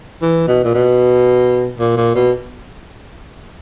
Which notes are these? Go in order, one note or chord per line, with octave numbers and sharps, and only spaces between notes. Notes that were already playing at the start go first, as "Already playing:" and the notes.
E3
B2
A#2
B2
A#2
A#2
B2